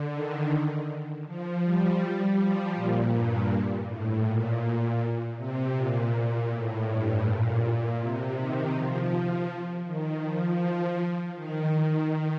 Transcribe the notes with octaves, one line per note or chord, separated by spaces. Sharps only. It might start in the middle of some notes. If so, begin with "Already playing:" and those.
Already playing: D3
D#3
F3
G3
G3
F3
A#2
G2
A2
A#2
C3
A#2
A#2
A2
G2
A#2
C3
D#3
F3
D#3
F3
F3
D#3
D#3